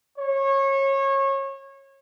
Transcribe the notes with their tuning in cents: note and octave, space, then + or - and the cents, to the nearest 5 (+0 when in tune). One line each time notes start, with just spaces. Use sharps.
C#5 -25